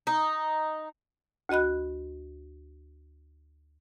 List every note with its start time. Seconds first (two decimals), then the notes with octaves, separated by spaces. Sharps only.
0.07 D#4
1.49 D2 F#4 D#5 B5 F#6